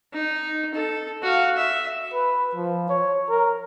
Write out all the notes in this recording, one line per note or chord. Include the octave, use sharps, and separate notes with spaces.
D#4
A4
F#4 F5
E5
B4
F3
C#5
A#4